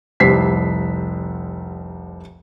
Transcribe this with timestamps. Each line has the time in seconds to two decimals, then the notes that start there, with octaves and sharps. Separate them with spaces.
0.20 F1 C2 G3 C4 B6 C7